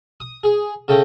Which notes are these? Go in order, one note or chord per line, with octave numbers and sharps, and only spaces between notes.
D#6
G#4
C#3 A3 G5 A#5